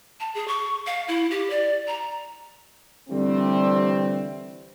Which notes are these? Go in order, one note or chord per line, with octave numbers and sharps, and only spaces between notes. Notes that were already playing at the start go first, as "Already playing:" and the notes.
A5
G#4
C#6
F5
E4
G4
D5
A#5
D3 E3 G3 A3 C4